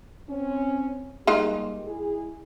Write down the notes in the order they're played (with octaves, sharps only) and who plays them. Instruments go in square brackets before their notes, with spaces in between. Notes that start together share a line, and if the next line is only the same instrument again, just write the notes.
[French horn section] C4 C#4
[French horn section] G3 A#3 G4 [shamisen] G#3 D#4 F4
[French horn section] E4 G#4